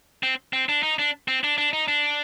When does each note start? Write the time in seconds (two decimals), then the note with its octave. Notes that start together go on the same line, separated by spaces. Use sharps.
0.23 C4
0.53 C4
0.69 D4
0.83 D#4
0.99 D4
1.28 C4
1.44 D4
1.58 D4
1.73 D#4
1.88 D4